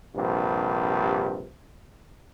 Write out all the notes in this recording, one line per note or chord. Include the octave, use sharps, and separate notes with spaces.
A#1 G2 C3